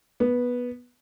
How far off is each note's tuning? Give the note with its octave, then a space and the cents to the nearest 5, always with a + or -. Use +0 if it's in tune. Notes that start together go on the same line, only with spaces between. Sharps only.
B3 -10